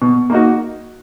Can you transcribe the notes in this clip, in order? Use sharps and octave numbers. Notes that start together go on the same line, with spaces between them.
B2
A#3 D#4 F#4